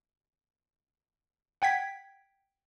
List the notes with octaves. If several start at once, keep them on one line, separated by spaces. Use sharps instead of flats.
F#5 G5 G#6 B6